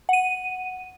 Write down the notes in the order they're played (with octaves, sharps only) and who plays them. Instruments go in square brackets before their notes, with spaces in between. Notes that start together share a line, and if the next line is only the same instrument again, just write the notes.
[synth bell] F#5 D#7